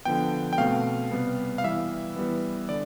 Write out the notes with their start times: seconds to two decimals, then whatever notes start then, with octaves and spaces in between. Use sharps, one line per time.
0.05 D3 F3 B3 G5
0.53 G5
0.58 B2 A3 C4 F5
1.11 C3 G3 B3
1.58 F5
1.64 E3 G3 B3 E5
2.16 E3 G3 B3
2.69 D3 D5